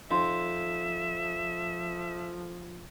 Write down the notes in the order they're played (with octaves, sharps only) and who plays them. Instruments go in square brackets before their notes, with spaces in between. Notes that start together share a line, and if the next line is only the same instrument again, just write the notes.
[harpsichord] F2 [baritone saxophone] F3 [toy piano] D#4 C6 [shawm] E5